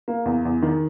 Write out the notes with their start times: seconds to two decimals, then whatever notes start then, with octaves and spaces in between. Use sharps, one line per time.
0.08 A#3
0.25 E2
0.45 E2
0.62 D#3